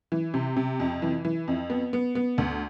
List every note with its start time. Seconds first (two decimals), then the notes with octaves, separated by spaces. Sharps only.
0.12 E3
0.34 C3
0.57 C3
0.80 F2
1.02 E3
1.25 E3
1.48 F2
1.70 B3
1.93 B3
2.15 B3
2.38 D2